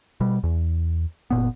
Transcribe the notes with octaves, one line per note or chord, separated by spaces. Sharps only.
B2 G3
E2
F#1 A#2 B3